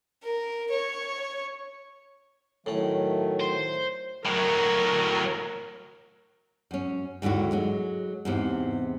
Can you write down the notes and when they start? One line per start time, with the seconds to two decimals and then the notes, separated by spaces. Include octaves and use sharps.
0.23 A#4
0.70 C#5
2.66 A2 D#3 F#3 A3 C#4
3.41 C5
4.26 A2 F#3 A#4
6.71 F#2 C#4
7.22 D#2 G#2 D3 E4 F#4
7.52 F#3 G#3
8.25 E2 G#2 C3